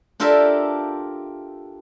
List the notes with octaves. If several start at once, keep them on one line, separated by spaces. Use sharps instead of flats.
D4 F4 G4 A4 A#4 E5